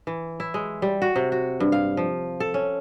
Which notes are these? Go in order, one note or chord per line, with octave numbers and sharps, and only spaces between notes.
E3
E4
G#3
G3
F#4
C3
F#4
G2
F5
F3
A4
C#4